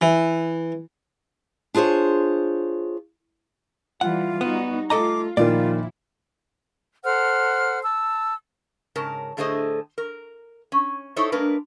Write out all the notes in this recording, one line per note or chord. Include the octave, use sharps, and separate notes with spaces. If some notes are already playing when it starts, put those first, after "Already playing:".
E3
D4 F4 G#4 C5 C#5
E3 G3 F4 F#5
G3 B3 D#4 F#4
A3 F4 A4 D#5 A#5 D6
A#2 D#3 F3 A#3 E4 F4 D5
A4 C5 F#5 F6
A5 E6
G#2 C#3 A#4 A5
A2 D3 A3 G#4 C5 D#5
A#4
C#4
D#4 E4 A4 C5 C#5
G#3 A#3 D4 A#4 B4